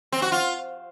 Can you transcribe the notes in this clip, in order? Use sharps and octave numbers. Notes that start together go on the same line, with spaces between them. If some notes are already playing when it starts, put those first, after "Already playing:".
C4
F#4
F4